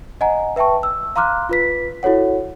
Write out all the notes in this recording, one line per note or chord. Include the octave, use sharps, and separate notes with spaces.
D#5 F#5 G#5 A#5
B4 E5 G5 A5 C#6
E6
F5 A#5 C6 D6 F6 F#6
F4 B4 B6
E4 F#4 A4 C#5 F#5